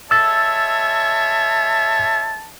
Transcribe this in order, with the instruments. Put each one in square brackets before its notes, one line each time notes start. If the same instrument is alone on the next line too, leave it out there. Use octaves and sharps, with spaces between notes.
[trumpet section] G#3 C#5 E5 [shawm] A5 [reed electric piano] E6 A6